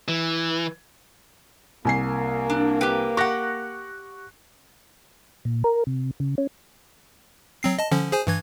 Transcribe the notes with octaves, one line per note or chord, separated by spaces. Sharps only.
E3
C2 A#3 G#5 C7
D4
G4 B4
G4 F#5 C#6 F#6 A#6
A#2
A#4
C3
C#3
C#4
F#3 C4 C7
D#5 A5
D3 F3 C#4
G#4 C5 G#5
G2 E3 G#6